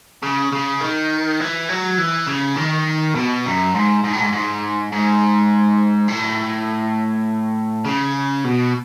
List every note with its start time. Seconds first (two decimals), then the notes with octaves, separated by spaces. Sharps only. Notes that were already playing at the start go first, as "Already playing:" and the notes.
0.23 C#3
0.53 C#3
0.81 D#3
1.40 E3
1.69 F#3
1.98 E3
2.27 C#3
2.57 D#3
3.15 B2
3.46 F#2
3.75 G#2
4.04 G#2
4.13 A2
4.21 G#2
4.33 G#2
4.92 G#2
6.09 A2
7.85 C#3
8.44 B2